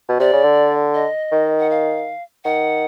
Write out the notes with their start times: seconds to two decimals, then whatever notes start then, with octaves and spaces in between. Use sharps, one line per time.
0.09 B2
0.20 C3 D5
0.33 C#3
0.44 D3
0.94 D#5
1.32 D#3
1.59 F#5
1.70 F5
2.44 D#3 F#5